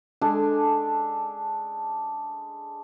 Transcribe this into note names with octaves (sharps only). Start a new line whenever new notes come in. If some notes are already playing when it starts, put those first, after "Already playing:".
G#3 D4 A4 G#5